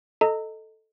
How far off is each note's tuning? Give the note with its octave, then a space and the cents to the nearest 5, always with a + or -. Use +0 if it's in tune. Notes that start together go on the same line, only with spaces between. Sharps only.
A4 +0 D#5 +0 A#5 -30